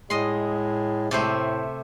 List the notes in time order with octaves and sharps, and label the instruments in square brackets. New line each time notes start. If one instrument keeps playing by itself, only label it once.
[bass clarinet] A2 [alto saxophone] G#3 [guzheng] D#5 C6
[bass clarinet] A2 [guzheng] C3 A3 C5